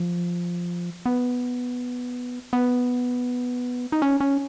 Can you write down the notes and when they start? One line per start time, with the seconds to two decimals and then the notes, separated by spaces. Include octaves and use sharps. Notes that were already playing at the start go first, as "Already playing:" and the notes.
Already playing: F3
1.06 B3
2.53 B3
3.92 D#4
4.02 C#4
4.20 C#4